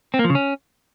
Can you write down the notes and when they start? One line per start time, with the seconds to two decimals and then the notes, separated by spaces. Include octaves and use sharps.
0.14 C4
0.19 A#3
0.24 F3
0.30 C#3
0.35 C#4